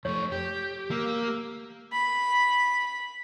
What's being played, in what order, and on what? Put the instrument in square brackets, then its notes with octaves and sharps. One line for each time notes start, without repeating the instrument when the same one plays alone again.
[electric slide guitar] F2 A3 [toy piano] C#5 [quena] C#6
[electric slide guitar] G4 [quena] G6
[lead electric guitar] A#3 [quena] E6
[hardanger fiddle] B5